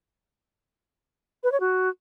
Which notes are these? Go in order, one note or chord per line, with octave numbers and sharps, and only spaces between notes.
B4
C#5
F#4